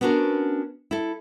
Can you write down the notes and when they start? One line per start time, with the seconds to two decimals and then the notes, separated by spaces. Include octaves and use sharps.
0.01 B3 C#4 D4 F#4 A#4
0.91 E4 A4